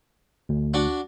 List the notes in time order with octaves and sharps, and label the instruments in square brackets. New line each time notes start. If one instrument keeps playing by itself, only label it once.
[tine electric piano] D2
[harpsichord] D4 F#4